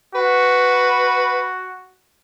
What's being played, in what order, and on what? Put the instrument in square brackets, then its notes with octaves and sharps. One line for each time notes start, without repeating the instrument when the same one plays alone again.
[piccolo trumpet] F#4 [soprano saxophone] B4